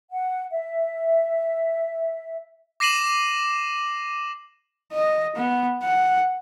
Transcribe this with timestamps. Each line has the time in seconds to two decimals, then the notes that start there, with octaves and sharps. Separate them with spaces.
0.12 F#5
0.51 E5
2.80 D6 A#6 C7 D#7 E7 F#7
4.92 D#5
5.36 B3
5.83 F#5